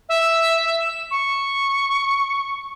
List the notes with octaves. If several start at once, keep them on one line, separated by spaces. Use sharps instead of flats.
E5
E5
E7
C#6